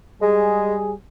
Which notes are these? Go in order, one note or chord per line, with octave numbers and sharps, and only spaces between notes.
G3 G#3 G#4